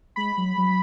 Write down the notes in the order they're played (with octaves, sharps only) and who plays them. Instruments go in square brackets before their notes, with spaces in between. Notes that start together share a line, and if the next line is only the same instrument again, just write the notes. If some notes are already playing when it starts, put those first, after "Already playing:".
[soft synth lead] G#3 [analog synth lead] B5
[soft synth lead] F#3
F#3